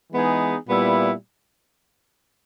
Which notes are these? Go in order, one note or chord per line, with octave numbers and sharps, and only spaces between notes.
E3 G#3 B3 D#4 G#4
A#2 G3 B3 E4